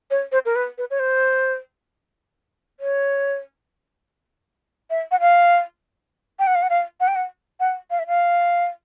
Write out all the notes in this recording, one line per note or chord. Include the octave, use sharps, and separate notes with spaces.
C#5
C5
A#4
B4
B4
C#5
C5
C#5
E5
F#5
F5
G5
F#5
F5
F#5
F5
F#5
G5
F#5
F#5
F5
E5
F5